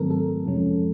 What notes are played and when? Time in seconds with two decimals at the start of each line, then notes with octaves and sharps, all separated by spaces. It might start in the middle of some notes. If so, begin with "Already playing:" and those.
Already playing: G#2 D#3 F#3 A3 C4 A4 A#4
0.10 A4
0.46 F2 C3 F3 G#3 C#4